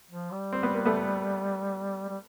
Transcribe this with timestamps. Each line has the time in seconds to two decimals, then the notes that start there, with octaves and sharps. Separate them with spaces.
0.11 F3
0.31 G3
0.53 C4
0.63 B3
0.74 A#3
0.86 A3 B3
2.09 G3